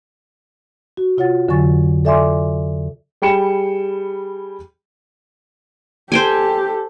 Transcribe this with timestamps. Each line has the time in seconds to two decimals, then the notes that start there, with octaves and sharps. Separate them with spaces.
0.97 F#4
1.17 C3 F4 C#5 F#5 A6
1.48 F2 D3 F#3 G#5 C#6 A6
2.05 A4 D5 E5 G#5 C6 D6
3.22 G3 G#4 G5 B5 C#7 E7
6.12 G4 A4 C5 G5 G#5